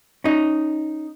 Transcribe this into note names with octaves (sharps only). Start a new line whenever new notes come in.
C#4 D#4